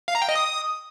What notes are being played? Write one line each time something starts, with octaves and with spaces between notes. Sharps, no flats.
F5
A#5
G5
D#5
D#6